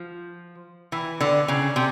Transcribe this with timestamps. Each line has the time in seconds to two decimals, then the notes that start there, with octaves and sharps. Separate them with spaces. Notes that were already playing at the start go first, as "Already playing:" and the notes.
Already playing: F3
0.92 E3
1.21 D3
1.48 C#3
1.76 C3